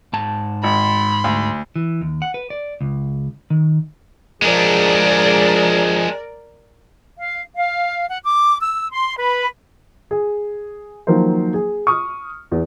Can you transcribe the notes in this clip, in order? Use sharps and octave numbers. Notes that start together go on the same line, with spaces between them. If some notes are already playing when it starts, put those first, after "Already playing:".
G#2 A5
G#1 B5 C6
D2
E3
D#2
F#5
B4
D5
C#2
D#3
F3 G#3 D4 G#4 A#4 D5
F5
F5
F#5
D6
E6
C6
B4
G#4
D#3 F3 F#3 A#3 A#4 C5
G#4
C#6 D#6 F6
E2